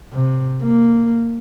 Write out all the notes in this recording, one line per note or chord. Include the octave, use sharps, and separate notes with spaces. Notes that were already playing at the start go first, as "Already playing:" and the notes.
C3
A#3